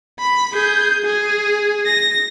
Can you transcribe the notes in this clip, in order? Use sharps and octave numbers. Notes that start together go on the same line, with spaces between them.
B5
G#4 G6
G#4
A#6